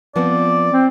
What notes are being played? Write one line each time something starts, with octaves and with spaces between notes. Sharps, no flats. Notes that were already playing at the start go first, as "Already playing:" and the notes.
F3 B3 C4 D5
C4